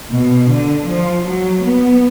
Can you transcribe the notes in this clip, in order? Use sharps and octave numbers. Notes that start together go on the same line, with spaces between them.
B2
D3
F3
F#3
B3